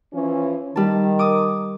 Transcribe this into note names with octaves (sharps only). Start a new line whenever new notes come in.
E3 F3 C#4
D#3 G3 A5
D6 D#6